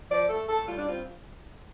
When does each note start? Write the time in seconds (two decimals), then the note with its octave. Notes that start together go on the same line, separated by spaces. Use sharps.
0.10 F3 D5
0.29 A3 A4
0.49 A2 A4
0.68 G3 F4
0.78 D4
0.87 C4 F4